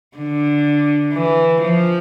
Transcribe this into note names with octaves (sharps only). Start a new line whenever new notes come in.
D3
E3
F3